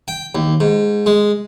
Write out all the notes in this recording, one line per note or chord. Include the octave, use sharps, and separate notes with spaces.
G5
D#2
G#2
G#3